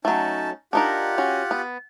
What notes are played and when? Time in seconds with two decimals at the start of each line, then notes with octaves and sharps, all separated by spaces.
0.05 F#3 A3 C#4 D#4 A5
0.73 D4 D#4 F4 G4 A#4 F#5
1.18 C#4 F#4
1.51 B3